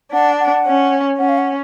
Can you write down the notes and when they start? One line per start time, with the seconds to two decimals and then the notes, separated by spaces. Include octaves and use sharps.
0.13 D4 F#5
0.40 F#5
0.67 C#4
1.19 C#4 F#5
1.29 F5
1.38 F#5